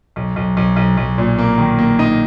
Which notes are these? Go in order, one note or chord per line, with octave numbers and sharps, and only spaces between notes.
B1
B1
B1
B1
B1
A#2
A#3
D#3
A#3
D#4